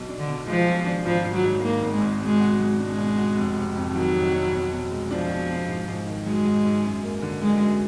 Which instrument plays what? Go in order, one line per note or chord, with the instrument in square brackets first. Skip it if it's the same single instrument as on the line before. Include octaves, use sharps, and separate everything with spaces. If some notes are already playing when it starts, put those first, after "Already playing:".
Already playing: [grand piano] B1
D4
[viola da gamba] D3
[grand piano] B2
[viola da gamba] F3 [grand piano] G#3
[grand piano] B1
D4
[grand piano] G#1 [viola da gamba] F3
[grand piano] G#1
[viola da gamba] F#3
[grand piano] G#2
[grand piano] D#3 [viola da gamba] A#3
[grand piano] G#1
[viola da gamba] G#3
[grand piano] G#1
[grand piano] B2 [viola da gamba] G#3
[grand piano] F#4
F#3
[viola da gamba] G#3 [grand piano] D4
[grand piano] B2
F#4
F1
F1
F2
[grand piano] D#3 [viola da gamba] F#3
[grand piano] F1
F1
B2
B2
G#3
[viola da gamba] F3 [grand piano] D4
[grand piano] B2
B2
G#2
G#2
D#3
[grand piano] F#3 [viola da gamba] G#3
[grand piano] G#2
G#2
F#2
A#3
D3
[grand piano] F#3 [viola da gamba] G#3
[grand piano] F#2